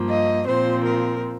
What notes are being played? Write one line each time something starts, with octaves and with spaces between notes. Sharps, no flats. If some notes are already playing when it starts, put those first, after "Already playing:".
Already playing: G2 F3 A#3
D#5
A#2 F3 C4 C5
A#4